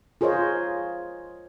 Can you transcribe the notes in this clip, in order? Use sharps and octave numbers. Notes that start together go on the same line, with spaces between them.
F4 G#4 A#4 C5 C#5 D#5